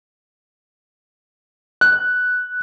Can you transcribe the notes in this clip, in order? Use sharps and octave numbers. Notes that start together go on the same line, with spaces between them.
F#6